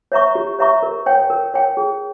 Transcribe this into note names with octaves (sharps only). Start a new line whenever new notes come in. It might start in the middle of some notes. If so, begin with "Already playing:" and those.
C#5 E5 A#5 C#6
G4
C#5 E5 A#5 C#6
A#4
C#5 G5
A#4
C#5 G5
G#4